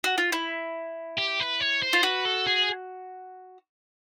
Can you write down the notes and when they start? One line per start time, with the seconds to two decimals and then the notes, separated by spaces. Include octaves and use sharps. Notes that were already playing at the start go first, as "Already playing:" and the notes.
0.04 F#4
0.18 F4
0.32 E4
1.18 G4
1.40 B4
1.60 C#5
1.82 C5
1.93 F4
2.03 F#4 B4
2.25 A4
2.47 G#4